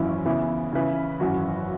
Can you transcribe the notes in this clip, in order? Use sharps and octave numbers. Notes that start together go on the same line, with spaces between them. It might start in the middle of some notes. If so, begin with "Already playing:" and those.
Already playing: G#1 F#2 E3 C#4 E4
C#3 E3 B3 E4
C#3 E3 C#4 E4 B4
G#1 F#2 E3 C#4 F#4